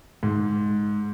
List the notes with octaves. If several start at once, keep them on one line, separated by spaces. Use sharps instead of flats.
G#2